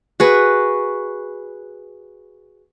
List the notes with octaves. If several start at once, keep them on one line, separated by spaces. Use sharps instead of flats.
F#4 G#4 B4